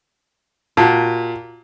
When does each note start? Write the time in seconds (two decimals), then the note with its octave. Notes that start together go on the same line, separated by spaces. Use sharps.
0.77 A#2 F#4 G4 A5